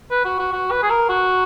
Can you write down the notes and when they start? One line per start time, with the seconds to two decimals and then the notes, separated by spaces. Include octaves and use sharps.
0.10 B4
0.25 F#4
0.39 F#4
0.53 F#4
0.71 B4
0.82 G#4
0.90 A#4
1.09 F#4